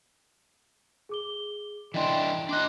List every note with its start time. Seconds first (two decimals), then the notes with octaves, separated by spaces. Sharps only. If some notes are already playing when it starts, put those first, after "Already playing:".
1.09 G#4 D6 G7
1.94 E3 D4 D#5 G5 C6
2.49 D4 D#5 C6 D6 F#6